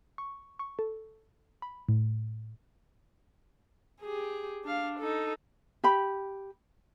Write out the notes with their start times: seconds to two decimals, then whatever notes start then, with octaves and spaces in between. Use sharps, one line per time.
0.18 C#6
0.59 C#6
0.79 A4
1.62 B5
1.89 A2
4.01 G4 G#4
4.64 D4 F5
4.99 D#4 A4
5.84 G4 B5